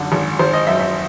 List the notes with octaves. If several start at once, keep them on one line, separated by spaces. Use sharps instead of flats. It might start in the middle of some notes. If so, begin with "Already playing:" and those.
Already playing: G#1 F#2 D3
G#1
G#1 C5
D#5
F#2 E5
E5